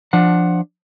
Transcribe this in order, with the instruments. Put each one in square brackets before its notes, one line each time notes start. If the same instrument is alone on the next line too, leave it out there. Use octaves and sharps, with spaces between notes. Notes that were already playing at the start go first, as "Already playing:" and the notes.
[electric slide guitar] F3 D4 F#5